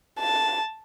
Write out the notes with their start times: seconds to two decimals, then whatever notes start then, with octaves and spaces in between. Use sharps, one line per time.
0.19 A5